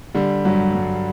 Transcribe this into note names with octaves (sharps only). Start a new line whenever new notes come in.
D3 G3
G2 F#3
G2